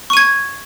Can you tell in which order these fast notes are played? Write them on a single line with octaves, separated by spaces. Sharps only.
C#6 D#7 G#6